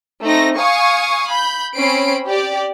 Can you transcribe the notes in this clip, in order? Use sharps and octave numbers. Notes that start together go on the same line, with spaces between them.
A3 C4 D#4 A#6
F5 G#5 C#6 D#6
B5 G6
C4 C#4 B5 C7 D7
G4 D5